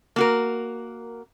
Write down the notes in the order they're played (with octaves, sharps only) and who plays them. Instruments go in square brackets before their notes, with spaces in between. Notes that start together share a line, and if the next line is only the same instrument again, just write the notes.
[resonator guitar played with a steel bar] A#3 F#4 A#4